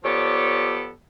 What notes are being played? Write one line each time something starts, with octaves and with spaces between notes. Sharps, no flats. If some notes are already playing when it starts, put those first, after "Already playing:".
F3 B3 G4 A4 C#5 D5